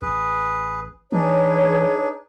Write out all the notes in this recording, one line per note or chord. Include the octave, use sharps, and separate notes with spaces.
A1 G#4 B4
E3 D4 D#4 G#4 B4 C#5